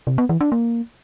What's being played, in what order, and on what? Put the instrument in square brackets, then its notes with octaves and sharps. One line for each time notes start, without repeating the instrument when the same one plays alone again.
[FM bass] C3
B3
E3
D4
A#3